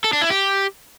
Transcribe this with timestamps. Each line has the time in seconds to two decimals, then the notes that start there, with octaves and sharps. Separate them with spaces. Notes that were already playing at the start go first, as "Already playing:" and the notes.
0.04 A4
0.13 D4
0.22 E4
0.30 G4